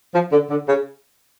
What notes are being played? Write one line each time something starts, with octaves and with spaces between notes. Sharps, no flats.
F3
D3
D3
C#3